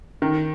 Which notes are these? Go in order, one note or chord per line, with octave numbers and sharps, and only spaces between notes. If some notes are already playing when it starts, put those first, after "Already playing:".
D#3